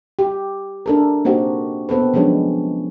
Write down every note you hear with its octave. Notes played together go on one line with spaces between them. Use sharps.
G4
D4 A4 A#4
A#3 C4 D#4 F#4 G4
B3 C4 A4 B4
F3 F#3 G#3 C#4 D4